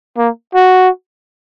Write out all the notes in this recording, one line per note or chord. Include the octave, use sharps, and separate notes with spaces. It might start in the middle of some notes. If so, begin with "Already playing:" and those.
A#3
F#4